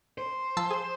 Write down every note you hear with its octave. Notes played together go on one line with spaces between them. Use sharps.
C5
F3 A5 E6
G#4